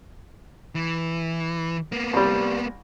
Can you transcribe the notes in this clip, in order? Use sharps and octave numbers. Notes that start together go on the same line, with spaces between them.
E3
A#3 B3
C2 G3